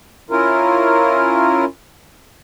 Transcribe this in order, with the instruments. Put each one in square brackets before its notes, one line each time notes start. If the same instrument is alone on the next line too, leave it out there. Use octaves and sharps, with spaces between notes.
[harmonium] C#4 E4 F4 A#4